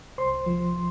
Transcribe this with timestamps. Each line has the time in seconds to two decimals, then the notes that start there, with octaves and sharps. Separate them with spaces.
0.18 C2 C5 C6
0.46 F3